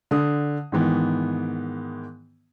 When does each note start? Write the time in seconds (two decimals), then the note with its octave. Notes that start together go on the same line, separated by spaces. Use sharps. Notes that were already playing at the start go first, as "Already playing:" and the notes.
0.11 D3 D#6
0.72 G#2 D#3 E3 B3